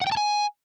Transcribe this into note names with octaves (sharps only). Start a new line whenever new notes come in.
F#5
G5
A5
G#5